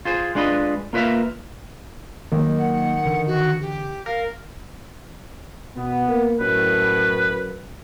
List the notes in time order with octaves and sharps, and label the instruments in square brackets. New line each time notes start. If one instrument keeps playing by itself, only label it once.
[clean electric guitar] F4 G#4 C5
G#3 D4 F4 B4 D#5
A#3 F4 B4 C5 E5 F5
[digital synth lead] D#3 [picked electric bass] F#3 G#3 A#3
[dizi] F#5
[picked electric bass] D3 E3
[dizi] F#4
G4
[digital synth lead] A#4 [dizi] F5
[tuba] B2 [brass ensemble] B3
[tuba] A#3
[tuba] F#2 [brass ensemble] A2 [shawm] B4